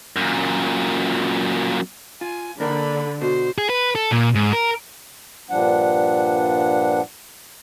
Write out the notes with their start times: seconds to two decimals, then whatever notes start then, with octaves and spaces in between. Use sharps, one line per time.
0.16 F#2 A#2
2.21 F4 G#5
2.60 D3 A#3 D4 A#4 B5
3.22 B2 F#4 C5
3.58 G#4
3.70 B4
3.95 A4
4.11 A#2
4.35 G#2
4.53 A#4
5.50 G2 A#2 F3 G3 D4 F#5